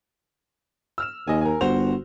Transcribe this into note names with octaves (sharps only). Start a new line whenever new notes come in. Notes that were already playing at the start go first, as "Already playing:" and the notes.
E6 F6 E7
D#2 D#5 G#5
A#4 G#5
G1 F#4 C5 F7